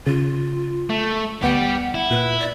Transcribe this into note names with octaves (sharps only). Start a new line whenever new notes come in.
C#3 F4
A3
D2 G3 B3 G4 F#5
E4
A#2 B4
D5